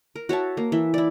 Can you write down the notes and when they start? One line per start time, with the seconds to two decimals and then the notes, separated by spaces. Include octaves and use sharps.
0.16 A#4
0.29 F#4 C#5 E5 A5
0.57 A#3
0.72 E3 E5
0.94 E4 D5